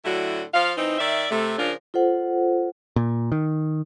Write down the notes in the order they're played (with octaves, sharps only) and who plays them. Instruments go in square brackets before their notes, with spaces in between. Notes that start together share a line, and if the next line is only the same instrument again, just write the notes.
[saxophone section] A2 D3 F#3 E4 F#4
F3 F5
E3 C4 D#4
D#3 D5 E5
C3 A3
C#3 F3 D4 F4 A#4
[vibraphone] F4 A4 C5 F#5
[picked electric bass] A#2
D#3